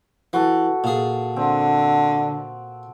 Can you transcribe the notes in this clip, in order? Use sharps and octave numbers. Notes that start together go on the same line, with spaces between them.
E3 F#4 A4
A#2 G#4
D3 C4